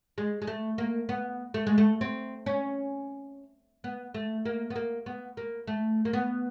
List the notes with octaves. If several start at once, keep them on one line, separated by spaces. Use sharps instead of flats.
G#3
G#3
A3
A#3
B3
A3
G#3
A3
C4
C#4
B3
A3
A#3
B3
A#3
B3
A#3
A3
A#3
B3